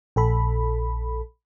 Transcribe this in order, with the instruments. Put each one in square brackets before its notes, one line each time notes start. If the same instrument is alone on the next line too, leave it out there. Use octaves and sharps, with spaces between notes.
[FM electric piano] A#1 A4 B5